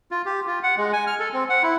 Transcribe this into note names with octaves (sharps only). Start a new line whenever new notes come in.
F4
G4
F4
F#5
G#3
G#5
F6
A4
C4
F#5
E4